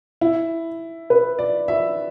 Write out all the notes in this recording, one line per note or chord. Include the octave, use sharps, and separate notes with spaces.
E4
B4
D5
E5